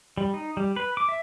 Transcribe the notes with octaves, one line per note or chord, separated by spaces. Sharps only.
G3
D#4
G3
B4
D6
E5